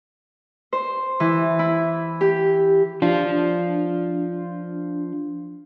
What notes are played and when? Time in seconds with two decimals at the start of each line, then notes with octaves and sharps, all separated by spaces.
0.73 C5
1.20 E3
1.59 E4
2.21 G4
3.02 F3 D4 F4